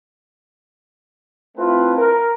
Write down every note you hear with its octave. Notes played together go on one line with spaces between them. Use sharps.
A3 C4 E4 F4 B4
A#4